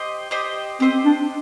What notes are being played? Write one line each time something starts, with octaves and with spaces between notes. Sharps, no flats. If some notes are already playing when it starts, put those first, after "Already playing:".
Already playing: G4 C5 D#5
G4 C5 D#5
C4 G4 C5 D#5
D4